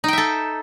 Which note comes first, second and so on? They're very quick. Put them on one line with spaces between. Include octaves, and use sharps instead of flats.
D#4 G5 E5 A4